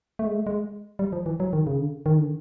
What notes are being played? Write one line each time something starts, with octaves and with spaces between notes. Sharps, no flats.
A3
G#3
A3
G#3
G3
F3
E3
F#3
D#3
C#3
D3
D#3
D3